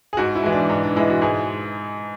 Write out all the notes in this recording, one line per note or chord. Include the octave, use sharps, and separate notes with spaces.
G#4
G#2 F#4
E4
E3 G#3
D4
G#2
D4
E3 G#3 E4
F#4
G#2 G#4